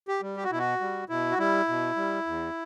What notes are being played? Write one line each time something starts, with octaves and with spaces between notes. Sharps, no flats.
G4
G3
G4
F#4
B2 E4
F#4
G3
B2 E4
F#4
G3 E4
B2
G3
E2